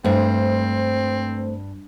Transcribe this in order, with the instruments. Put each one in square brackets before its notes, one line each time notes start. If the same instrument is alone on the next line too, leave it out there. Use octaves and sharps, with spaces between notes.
[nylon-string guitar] G2 [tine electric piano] A3 C5 [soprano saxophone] C4